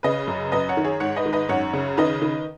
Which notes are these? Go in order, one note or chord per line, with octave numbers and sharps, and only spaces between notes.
C#3 B4 D#5
F#2
F#2 B4 D#5
C#5 F#5
D#3
G#4 C#5
G#2 C#5 F#5
B4 D#5
D#3
B4 D#5
F#2 C#5 F#5
C#3
D#3 B4 D#5
D#3